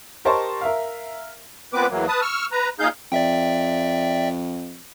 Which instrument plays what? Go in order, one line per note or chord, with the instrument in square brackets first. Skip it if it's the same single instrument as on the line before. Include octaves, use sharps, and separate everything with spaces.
[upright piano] G4 A#4 C5 D#5 A5 C#6
A#4 E5 F5
[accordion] A#2 B3 C4 B4 D6
E2 E3 F#3 A#3
B4 A5 D#6
C#6 E6 F6
B4 A#5
A#2 D#4 G#4 F5 G6
[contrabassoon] F2 [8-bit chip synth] D5 E5 G5